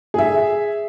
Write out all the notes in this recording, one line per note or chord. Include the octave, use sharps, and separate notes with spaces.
G#4 E5